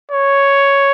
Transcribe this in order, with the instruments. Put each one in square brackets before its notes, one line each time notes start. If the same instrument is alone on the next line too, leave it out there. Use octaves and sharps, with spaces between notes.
[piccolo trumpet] C#5